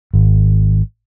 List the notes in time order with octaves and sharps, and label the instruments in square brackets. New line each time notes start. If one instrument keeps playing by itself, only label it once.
[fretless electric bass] G#1